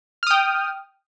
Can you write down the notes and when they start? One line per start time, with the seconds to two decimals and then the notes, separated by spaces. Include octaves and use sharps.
0.23 F6
0.27 D#6
0.31 G5